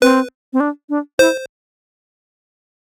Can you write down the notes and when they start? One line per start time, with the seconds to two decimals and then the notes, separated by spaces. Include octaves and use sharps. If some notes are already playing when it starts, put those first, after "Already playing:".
0.02 C4 B4
0.53 C4
0.60 D4
0.90 D4
1.19 E4 C5